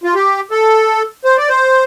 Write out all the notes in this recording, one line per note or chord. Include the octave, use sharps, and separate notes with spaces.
F4
G4
A4
C5
D5
C5